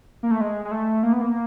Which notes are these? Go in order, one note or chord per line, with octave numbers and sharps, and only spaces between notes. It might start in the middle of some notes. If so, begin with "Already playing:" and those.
A#3
A3
G#3
G#3
A3
A#3
B3
A#3